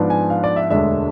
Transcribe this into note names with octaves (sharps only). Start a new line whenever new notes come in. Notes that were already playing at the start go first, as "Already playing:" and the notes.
Already playing: G#2 F3 B3 D4
G#5
F5
D5
E5
E1 D2 D3 G#3 D4 E5